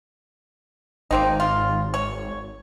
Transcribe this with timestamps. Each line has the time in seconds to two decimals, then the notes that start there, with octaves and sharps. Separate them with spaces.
1.11 G#1 A#3 C4 D#4
1.40 F4
1.94 C#5